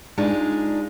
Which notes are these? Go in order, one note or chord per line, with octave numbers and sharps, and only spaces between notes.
G#3 D4 D#4 F4